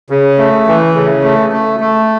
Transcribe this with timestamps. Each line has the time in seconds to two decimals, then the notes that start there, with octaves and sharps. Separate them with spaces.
0.10 C#3
0.38 A3
0.67 E3
0.95 C#3
1.23 A3
1.52 A3
1.80 A3